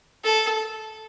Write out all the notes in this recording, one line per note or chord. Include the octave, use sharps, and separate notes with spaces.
A4